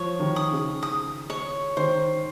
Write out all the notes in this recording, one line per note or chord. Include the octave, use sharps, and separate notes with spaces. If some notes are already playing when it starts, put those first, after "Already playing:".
Already playing: F3 C#5
D#3
D#6
C#3
D#6
C#5
D#3 C5